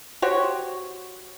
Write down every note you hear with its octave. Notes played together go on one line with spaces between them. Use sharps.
F#4 G4 C5 C#5